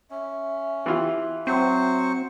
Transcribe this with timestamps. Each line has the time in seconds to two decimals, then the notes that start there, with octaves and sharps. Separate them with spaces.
0.11 C#4 E5
0.86 E3 F4 G4
1.47 F#3 C4 C5 C#6